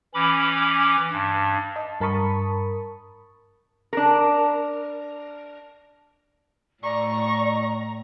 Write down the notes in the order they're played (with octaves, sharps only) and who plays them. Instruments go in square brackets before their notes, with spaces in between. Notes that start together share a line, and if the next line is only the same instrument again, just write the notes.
[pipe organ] E3 C#4 B5 D6
G2
[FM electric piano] D#5 A5
G2 A#4 A5 B5 C#6 D#6
[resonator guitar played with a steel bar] D4 A#4
[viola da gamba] A2 [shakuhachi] D5 [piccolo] A#5 [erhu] C#6